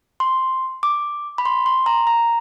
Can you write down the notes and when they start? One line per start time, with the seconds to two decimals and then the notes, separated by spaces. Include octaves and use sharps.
0.20 C6
0.83 D6
1.38 B5
1.45 C6
1.66 C6
1.86 A#5
2.07 A#5